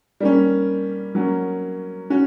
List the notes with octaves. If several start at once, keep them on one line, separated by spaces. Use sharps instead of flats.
G3 A#3 C#4
F#3 A#3 C#4
C#4 F#4